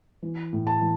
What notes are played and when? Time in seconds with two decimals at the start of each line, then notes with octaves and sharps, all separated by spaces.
0.22 E3
0.53 A2
0.67 A5
0.81 E3